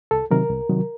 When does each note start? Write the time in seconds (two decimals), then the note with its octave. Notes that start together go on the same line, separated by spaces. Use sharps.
0.11 C2 A4
0.31 C3 D#3 F#3 A#4
0.50 C2
0.69 C3 D#3 F#3